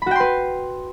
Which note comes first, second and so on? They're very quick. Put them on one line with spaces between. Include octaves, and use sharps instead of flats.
B5 F#4 G5 C6 B4